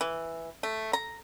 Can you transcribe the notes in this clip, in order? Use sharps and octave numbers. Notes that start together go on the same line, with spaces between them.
E3
A3
A#5